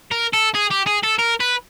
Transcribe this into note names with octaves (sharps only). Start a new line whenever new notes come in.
A#4
A4
G#4
G4
G#4
A4
A#4
B4